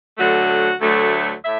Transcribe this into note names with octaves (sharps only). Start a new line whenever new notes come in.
D2 D3 F#3 A3 F#4
D2 D3 F#3 A3
A2 E5